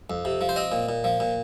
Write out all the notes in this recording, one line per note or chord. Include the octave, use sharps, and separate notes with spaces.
F2
C3
F3
C5
C4 D#5
A#2
A#2
F3
A#2